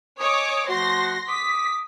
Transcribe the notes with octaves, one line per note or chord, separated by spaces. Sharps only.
C#5 D#5 G#5 D6 D#6
F3 A3 F#4 C6 A#6
D6 D#6 B6